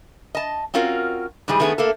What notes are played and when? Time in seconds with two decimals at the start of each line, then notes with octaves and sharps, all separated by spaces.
0.35 D#5 A5
0.74 C4 C#4 F4 F#4 A#4
1.48 G#2 E3 G3 G#4
1.60 D#3 A3 B3 D4 G#4
1.78 A3 A#3 A4